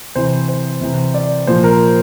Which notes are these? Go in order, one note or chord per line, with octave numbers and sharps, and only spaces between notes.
C3 E3 C5
C5
C3 E3
D5
A#2 F3 C5
A#4